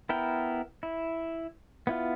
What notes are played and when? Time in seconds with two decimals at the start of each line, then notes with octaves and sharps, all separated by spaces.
0.09 B3 E4 A#4 G5
0.83 E4
1.87 B3 E4 F4